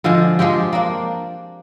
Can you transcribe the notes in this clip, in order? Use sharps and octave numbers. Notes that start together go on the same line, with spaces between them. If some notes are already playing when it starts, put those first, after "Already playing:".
D3 F3 G#3
F3 G#3 C4 G4
A#3 D4